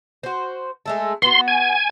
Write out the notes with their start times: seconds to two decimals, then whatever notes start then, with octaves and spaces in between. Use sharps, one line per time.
0.23 F#4 C5
0.86 G#3 A3 A4
1.22 B3 F#4 C6
1.48 G#5